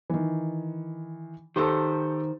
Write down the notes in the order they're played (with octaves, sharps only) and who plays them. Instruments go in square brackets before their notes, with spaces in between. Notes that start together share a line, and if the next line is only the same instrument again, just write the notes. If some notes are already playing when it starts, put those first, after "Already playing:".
[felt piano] D#3 E3
[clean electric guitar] D#3 C5 [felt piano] G4 A4